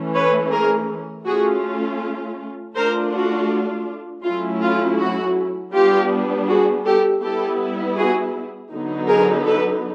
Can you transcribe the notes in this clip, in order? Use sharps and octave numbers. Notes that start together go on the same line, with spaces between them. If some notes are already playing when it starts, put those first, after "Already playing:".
Already playing: E3 A3 C#4
B4 C#5
G#4 A#4
A3 C#4 F4 F#4 G#4
A3 D4 F4 A#4 C5
F#4
F#3 A3 C#4 E4 F4
F4
F#4
G3 B3 D4 F4 G4
F#4 G#4
G4 A4
G3 B3 E4 G4 A4
F#4 G#4
D3 F#3 B3 D#4
G#4 A#4
A4 B4